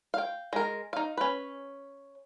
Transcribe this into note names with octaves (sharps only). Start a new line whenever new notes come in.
F5 G5
G#3 A#4
D#4 F5
C#4 B4